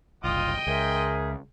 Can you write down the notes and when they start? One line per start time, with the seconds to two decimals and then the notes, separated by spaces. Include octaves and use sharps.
0.24 F#1 C2 F4 D#5 G5 D#6
0.67 C#2 G#4 A#4 C5 E5